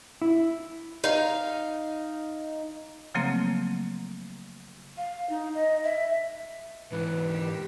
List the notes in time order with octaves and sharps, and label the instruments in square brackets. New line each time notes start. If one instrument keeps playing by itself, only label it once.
[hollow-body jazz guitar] E4
[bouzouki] D#4 F5
[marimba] C#3 F3 F#3 A3 A#3 C4
[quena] F5
D#4
D#5
E5
[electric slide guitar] G#2 E3 [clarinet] B4
[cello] D#3 G4